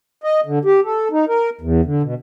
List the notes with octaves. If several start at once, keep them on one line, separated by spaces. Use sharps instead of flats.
D#5
D3
G4
A4
D#4
A#4
E2
D3
B2